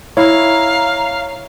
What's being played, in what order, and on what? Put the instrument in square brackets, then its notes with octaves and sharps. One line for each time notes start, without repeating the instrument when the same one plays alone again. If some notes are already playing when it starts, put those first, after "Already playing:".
[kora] E4 [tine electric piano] C#5 [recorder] F5 [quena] A#5